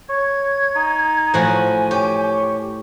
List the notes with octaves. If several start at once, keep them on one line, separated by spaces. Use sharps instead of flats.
C#5 G#6
D#4
A2 F3 F#4 G#5
G4 C#5